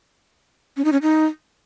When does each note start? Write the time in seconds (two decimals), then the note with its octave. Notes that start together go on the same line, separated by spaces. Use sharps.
0.77 C#4
0.85 D#4
0.92 C#4
1.02 D#4